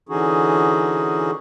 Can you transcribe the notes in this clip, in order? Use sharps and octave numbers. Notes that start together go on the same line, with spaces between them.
D3 E3 C#4 D#4 F#4 G#4